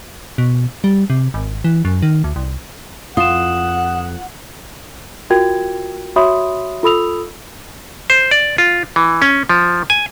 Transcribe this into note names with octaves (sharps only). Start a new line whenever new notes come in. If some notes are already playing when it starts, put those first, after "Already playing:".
B2
G3
C3
G#1
E3
F#2
D#3
D2
C2
F2 F4 F#5 D#6 E7
F4 F#4 A#4 G5 G#6
F#4 C#5 E5 B5 C6 D#6
F4 A4 B5 D#6 E6 F7
C5
D5
F4
E3
C#4
F3
G#5